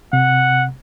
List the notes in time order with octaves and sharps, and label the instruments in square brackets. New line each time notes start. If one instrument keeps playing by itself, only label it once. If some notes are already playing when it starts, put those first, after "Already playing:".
[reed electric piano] C3 [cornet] F#5